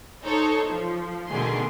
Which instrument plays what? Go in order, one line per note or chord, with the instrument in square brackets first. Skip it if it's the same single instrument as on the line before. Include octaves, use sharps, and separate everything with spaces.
[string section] D#4 A4 C5 C#5
F3
B2 D3 D#3 A3 G#4 C6